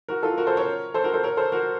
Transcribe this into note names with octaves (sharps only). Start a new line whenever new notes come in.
F#4 A#4
F4 A4
F#4 A#4
A4 C5
A#4 C#5
A4 C5
F#4 A#4
A4 C5
A#4 C#5
A4 C5
F#4 A#4